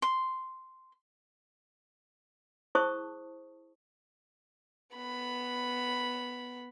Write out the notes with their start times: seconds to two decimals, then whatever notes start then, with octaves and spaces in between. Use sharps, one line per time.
0.02 C6
2.75 E4 G#4 C5 A5 C#6 D#6
4.97 B3 B5